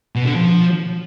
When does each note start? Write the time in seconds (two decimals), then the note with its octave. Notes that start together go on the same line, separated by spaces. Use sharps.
0.16 B2
0.26 D3
0.36 F3